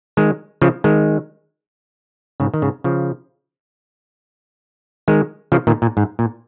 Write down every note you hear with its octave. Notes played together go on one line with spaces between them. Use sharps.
D#3 G#3
C#3 F3
D#3 G#3
G#2 C#3
D#3
G#2 C#3
C#3 F3
D#3 G#3
C#3 F3
A#2 D#3
A#2
G#2
A#2